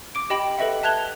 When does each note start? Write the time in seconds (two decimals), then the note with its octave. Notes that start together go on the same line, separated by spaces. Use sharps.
0.15 D6 D7
0.30 G4 D#5 G5 B5 D7 F#7
0.58 A4 B4 D#5 E5 F#5
0.83 E5 A5 F#6 G#6 F7 G7